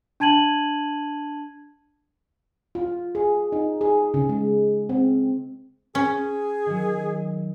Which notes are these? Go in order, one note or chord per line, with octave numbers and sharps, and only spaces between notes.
D4 A5 G#6 D#7 F#7
F4
G#4
D#4
G#4
C#3
G#3
C4
C#4 G#4
D#3 F#3